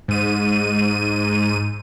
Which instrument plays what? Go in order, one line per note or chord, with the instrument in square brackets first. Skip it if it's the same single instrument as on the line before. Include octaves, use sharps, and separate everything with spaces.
[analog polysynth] G#2 D#7